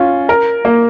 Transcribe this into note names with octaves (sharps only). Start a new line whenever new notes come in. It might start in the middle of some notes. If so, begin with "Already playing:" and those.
Already playing: C#4 F4
A#4
A#3